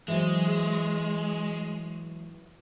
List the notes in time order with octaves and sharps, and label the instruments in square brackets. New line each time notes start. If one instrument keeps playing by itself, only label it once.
[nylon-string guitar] E3 F#3 C5 [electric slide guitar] G#3